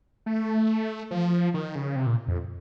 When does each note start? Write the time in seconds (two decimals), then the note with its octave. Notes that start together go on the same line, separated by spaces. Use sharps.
0.26 A3
1.11 F3
1.54 D#3
1.75 C#3
1.96 C3
2.06 A#2
2.28 F2